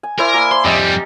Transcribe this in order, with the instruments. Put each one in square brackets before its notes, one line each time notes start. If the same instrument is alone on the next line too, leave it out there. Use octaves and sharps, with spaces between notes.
[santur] G#5
[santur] E4 C5 D5 [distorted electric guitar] A#4
[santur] A#3 G#5 D6
[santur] C5 [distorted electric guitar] C6
[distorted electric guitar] F2 G3 [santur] G4 D#5